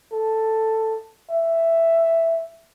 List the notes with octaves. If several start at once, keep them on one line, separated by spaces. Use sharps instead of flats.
A4
E5